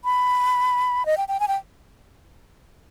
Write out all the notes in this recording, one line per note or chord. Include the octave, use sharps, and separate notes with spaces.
B5
D#5
G5
G5
G#5
G5